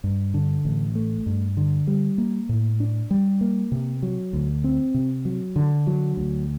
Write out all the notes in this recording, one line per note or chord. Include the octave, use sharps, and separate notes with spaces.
G2
D3
A1
A3
G2
D3
G3
A#3
A2
D4
G3
A#3
C3
F#3
D2
C4
C3
F#3
D3
F#3
D2